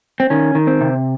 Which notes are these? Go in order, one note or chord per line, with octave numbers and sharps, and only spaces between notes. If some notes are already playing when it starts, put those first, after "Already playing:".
C4
D#3 C#4
D#3
C4
C3